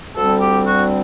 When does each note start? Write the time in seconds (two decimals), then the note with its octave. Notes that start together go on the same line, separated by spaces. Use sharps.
0.15 D2 D3 G3 C4 A4
0.41 G4
0.65 F#4